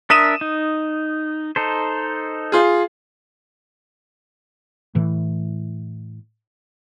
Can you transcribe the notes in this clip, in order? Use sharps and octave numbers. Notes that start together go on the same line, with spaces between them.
D4 A#4 E5 D#6 D#7 E7
D#4
D#4 A4 C5
F4 G#4
A2 E3